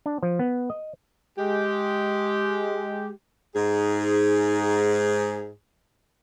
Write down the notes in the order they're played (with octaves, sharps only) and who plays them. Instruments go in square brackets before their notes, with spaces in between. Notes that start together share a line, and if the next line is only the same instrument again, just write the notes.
[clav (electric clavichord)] D4
F3
B3
D#5
[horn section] G#3 G4
[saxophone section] G#2 G#4